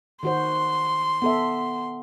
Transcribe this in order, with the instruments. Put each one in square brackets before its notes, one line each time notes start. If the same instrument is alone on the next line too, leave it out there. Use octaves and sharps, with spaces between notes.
[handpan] D#3 F#4 C5 [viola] C6
[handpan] B3 A4 E5